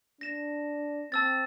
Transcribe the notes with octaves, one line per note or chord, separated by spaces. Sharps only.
D4 A#6 E7
C4 A5 E6 A6